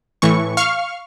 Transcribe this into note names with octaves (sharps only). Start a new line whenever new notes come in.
A2 E3 C#6
F5 C#6 F6